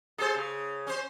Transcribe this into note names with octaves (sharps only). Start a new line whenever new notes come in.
G#4 A4 C5
C#3
C#4 C5